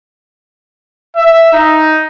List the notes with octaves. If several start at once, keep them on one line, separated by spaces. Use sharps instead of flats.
E5
D#4